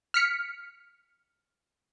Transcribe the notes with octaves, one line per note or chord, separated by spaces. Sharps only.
F6 B6 C#7